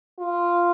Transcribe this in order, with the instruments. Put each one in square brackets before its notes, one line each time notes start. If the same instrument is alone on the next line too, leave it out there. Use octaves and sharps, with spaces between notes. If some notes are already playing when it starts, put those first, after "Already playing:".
[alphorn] F4